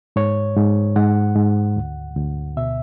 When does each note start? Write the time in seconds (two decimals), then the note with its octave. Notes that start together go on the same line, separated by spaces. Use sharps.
0.16 G#2 C#5
0.56 G#2
0.96 G#2 F#5
1.36 G#2
1.76 D2
2.16 D2
2.57 B2 E5